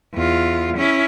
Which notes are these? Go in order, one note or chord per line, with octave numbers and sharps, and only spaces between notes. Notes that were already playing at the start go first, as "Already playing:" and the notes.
E2 F4
C#4 E4